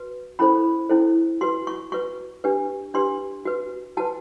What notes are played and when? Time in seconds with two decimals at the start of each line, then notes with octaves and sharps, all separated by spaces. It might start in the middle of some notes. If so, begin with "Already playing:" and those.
Already playing: F#4 B4
0.39 C#4 E4 A4 C5 B5
0.89 C#4 E4 A4 C5
1.41 F#4 B4 C6
1.67 C#6
1.92 F#4 B4 C#6
2.44 D4 G4 B4
2.94 D4 G4 B4 C6
3.45 F#4 B4
3.97 F#4 B4 A5